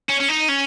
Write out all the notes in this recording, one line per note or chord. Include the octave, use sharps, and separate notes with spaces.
C#4
C#4
D#4
C#4